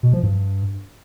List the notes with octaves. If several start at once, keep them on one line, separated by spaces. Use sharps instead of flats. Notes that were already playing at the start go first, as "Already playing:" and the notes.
B2
F3
G2